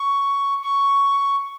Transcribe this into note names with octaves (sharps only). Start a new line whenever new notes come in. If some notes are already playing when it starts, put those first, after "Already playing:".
Already playing: C#6
C#6